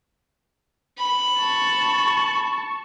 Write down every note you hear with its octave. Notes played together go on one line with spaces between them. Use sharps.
B5
A5 C#6